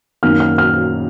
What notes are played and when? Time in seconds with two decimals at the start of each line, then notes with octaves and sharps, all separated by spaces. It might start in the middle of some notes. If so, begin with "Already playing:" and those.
0.23 F#2 D#3 A#3 F6
0.40 F6
0.58 F6